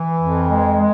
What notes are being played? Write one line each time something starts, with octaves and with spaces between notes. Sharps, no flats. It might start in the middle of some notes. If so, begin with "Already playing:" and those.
Already playing: E3
F2
G#3
G#3